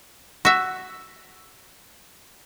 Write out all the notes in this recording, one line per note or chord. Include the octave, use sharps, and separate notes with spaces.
F#4 E5